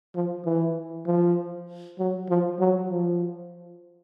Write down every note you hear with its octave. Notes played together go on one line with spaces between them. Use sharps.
F3
E3
F3
F#3
F3
F#3
F3